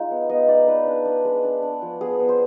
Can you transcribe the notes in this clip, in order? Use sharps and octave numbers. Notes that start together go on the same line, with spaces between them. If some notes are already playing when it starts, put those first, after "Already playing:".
Already playing: G#3 D#4 F4 F5
B3
B3 D#5
D#4 D5
D#4 B4
D4
D4
G#3
D4
D4
F3
B3 G#4
B3
C5